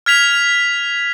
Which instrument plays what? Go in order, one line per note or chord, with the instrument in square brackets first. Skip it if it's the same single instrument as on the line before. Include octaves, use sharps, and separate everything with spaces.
[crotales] F6 G#6 B6 F7